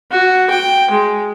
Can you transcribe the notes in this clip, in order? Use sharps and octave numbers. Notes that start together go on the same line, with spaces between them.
F#4
G5
G#3